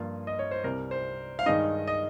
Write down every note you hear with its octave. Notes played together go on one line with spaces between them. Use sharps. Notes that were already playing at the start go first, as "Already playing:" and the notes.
Already playing: G2 F3 A#3 F4
D#5
C#5
C5
C2 C3 G3 A#4
C5
F5
G2 D#3 G#3 D#4 D#5
D#5